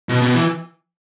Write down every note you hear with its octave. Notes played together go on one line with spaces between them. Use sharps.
B2
B2
E3